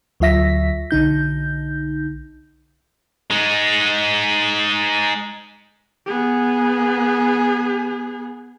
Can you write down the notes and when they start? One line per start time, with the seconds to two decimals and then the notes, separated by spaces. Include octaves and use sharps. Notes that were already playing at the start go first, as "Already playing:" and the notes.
0.20 D2 F#3 F4 E5 A#6 B6
0.91 B1 D3 D#4 G6
3.31 G#3 D#4
6.07 B3 G#4